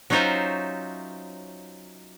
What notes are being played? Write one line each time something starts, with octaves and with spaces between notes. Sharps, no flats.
F#3 C#4 D#4 F4 C5 E5